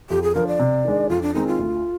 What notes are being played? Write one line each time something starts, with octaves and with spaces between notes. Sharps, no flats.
F2 G4
G#4
D3 F3 A#4
D5
C3
D#3 G#3 D4
F2 F4
D4
D#3 G#3 C4 D#4
F4
D2